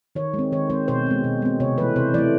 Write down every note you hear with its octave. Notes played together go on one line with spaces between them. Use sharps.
D#3 C#5
G#3 C4
D#3 C#5
G#3 C4 C5
B2 C5
G#3 C4
B2
G#3 C4
C3 C#5
E3 A3 B4
C3 C5
E3 A3 D5